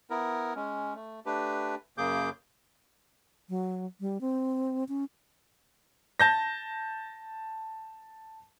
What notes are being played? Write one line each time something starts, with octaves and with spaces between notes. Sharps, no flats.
B3 E4 A#4
G#3 C#4
A3
A3 D4 G4 B4
F#2 C#3 A#3 G#4 D6 G6
F#3
G3
C4
C#4
A5 G6 A#6